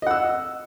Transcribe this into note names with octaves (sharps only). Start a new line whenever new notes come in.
D#5 F#5 E6